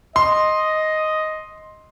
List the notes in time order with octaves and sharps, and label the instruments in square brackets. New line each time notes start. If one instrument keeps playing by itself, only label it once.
[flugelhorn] D#5 [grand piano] C6